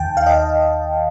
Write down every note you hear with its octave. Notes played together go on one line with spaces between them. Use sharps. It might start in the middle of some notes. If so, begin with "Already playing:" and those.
Already playing: D#2 D#3 G5 A5
F5
D#5